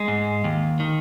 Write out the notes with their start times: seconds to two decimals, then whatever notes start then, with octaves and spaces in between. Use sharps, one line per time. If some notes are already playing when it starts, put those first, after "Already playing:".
Already playing: G#3
0.08 G#2
0.44 D#2
0.80 D#3